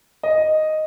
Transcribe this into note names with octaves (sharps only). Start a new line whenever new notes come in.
D#5